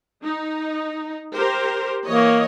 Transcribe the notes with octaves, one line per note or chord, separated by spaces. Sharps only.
D#4
G4 A#4 C5
E3 A#3 C#5 D#5